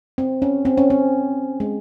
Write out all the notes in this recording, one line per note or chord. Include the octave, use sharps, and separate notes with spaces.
C4
C#4
C4
C#4
C4
G#3